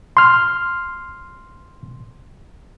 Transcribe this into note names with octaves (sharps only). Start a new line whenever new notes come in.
C6 F6